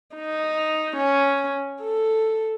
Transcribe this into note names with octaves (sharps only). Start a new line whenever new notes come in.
D#4
C#4
A4